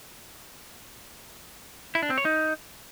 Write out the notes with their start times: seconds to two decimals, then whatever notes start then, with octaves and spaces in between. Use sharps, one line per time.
1.95 E4
2.03 D4
2.10 C4
2.18 C#5
2.25 D#4